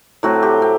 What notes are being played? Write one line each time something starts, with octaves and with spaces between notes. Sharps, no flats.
A2 F#3 C4 F#4
G4
C4